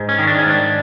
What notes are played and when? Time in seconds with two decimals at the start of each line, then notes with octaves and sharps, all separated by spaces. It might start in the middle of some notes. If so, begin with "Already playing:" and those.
Already playing: G#2
0.09 C#4
0.19 D#3
0.27 D4
0.39 C#4
0.46 G#2 D4